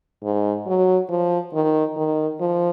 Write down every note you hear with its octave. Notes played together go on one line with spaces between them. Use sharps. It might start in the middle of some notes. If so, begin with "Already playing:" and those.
G#2
F#3
F3
D#3
D#3
F3